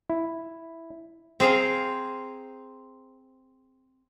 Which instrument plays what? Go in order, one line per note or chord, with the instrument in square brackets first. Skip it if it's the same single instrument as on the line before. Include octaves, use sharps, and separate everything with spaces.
[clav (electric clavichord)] E4
[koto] C4 G#4 C5 F5 A#5